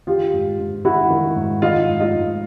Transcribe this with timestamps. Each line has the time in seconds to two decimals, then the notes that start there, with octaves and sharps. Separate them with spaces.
0.07 D#3 F4 G4
0.33 G#2
0.59 G#2
0.85 D#3 E4 F#4
1.10 D#3
1.36 G#2
1.62 D#3 D#4 F4
1.88 G#2
2.00 D#4 F4
2.13 G#2